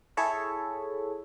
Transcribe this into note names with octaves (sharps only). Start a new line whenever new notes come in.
E4 G#4 A4 C#5 E5